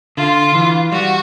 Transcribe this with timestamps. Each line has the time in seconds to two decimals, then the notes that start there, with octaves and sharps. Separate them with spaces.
0.17 D3 F4
0.55 E3
0.92 G3 F#4